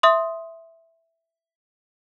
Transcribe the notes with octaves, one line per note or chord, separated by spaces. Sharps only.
E5 C6 D#6